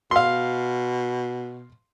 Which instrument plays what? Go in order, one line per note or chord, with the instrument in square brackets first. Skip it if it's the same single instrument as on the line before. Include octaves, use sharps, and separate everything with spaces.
[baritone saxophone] B2 [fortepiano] F5 C6